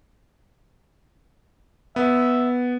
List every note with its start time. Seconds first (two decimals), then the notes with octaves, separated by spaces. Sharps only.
1.96 B3 E5